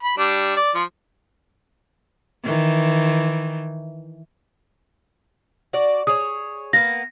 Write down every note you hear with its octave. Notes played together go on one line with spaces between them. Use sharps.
B5
G3 D4
D5
F3
D#3 E3
F#4 D5
G#4 C#5 D#6
A#3 B3 A#6